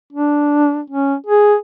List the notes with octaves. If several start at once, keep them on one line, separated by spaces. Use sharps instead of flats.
D4
C#4
G#4